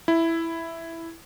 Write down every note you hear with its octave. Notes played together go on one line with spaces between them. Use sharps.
E4